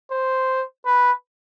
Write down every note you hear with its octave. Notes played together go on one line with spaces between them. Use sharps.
C5
B4